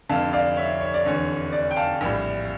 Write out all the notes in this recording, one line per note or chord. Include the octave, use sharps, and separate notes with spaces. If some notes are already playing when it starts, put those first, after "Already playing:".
F1 F2 D3 F5 A5
D5 F5
C#5 E5
C#5
D5
F1 E2 D3 C#5
D5
G5
F5 A5
A#1 A2 G3